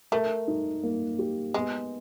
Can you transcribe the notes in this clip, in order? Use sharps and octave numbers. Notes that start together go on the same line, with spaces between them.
A3 A#4
D#4
A#3
G4
G#3 B3